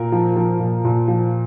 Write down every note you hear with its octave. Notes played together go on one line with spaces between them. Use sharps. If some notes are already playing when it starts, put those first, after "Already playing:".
Already playing: A#2 A#4
F3
F3
A#2
A#2
F3